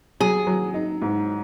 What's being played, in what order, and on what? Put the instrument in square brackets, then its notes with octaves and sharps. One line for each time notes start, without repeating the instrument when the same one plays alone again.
[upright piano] F#3 [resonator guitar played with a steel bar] G#4
[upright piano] F#3
D#4
G#2